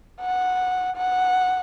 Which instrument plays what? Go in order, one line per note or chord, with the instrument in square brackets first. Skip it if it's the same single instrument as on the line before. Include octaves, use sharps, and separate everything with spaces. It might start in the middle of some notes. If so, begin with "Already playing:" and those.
[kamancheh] F#5
F#5